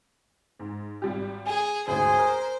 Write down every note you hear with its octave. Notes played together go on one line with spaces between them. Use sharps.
G#2
G#1 G3 G4
G#4 G#5
A1 D2 G#2 G#4 C5
A#4